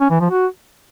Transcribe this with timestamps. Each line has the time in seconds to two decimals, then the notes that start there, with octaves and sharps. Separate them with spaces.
0.01 C#4
0.11 E3
0.21 F3
0.30 F#4